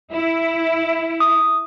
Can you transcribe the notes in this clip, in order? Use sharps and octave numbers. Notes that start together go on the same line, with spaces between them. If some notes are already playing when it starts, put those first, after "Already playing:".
E4
D#6